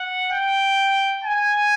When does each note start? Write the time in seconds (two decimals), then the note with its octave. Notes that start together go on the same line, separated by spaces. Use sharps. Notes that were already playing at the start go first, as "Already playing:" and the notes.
Already playing: F#5
0.32 G5
1.24 G#5